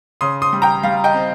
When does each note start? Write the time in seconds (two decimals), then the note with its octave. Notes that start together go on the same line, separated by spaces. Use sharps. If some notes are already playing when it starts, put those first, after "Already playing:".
0.21 C#3 C6 D#6
0.42 C6 D#6
0.53 G3
0.62 G5 A#5
0.83 G3 F5
1.04 D#5 G5
1.14 C4